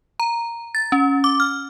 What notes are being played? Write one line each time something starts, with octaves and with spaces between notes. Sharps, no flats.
A#5
A6
C#4
D6
F6